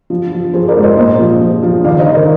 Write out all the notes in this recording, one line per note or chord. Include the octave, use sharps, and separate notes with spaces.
F3
F3
F3 G#4 C5
A#4 D5
G#2
C5 D#5
A#2 C5 D#5
F3
F3
F3
D#3 D5 F5
C5 D#5
D#3
A#4 D5